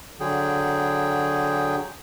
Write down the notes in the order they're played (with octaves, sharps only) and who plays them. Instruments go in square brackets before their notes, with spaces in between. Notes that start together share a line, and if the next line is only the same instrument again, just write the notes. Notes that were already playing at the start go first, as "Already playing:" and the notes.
[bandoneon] D3 F#3 G#4 G5